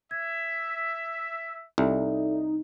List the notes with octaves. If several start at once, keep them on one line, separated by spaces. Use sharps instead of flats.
E5 G#6
C2 D#4 A4 D5 E5